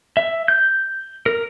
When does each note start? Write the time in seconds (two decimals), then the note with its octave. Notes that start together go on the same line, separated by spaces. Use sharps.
0.17 E5
0.48 G6
1.26 A#4